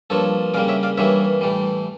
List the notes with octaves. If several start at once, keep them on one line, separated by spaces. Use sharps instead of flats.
G2 F3 A#3 A4 C#5
C#3 G3 A#3 D5 F5
C#5 E5
D5 F5
G2 E3 G3 A#3 C#5 E5
A2 E3 G3